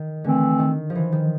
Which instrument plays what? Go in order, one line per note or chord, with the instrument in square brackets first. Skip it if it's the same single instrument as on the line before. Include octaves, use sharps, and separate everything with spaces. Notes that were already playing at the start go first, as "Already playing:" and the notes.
Already playing: [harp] D#3
[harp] D3 [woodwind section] E3 A3 C4
[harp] D#3
F3
E3
D#3